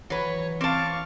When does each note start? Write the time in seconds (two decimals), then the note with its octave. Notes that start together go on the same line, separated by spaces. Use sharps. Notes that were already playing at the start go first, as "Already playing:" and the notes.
0.10 E3 F#3 B4 C#5
0.61 C4 F5 A5 C#6 D6